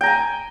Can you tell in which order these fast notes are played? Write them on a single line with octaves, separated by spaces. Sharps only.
G5 A#5 G#5